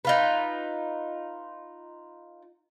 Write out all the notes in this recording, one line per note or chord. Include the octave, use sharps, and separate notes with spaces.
D#4 F4 B4